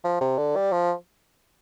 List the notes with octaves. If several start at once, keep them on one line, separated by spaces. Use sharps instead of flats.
F3
C3
D3
G3
F3